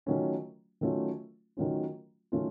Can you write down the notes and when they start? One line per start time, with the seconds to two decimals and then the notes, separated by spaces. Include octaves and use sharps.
0.06 D#3 F#3 A3 C#4 F4
0.81 D#3 F#3 A3 C#4 F4
1.57 D#3 F#3 A3 C#4 F4
2.32 D#3 F#3 A3 C#4 F4